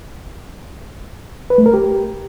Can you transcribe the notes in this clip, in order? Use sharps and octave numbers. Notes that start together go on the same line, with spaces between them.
B4
A3
A#4
G4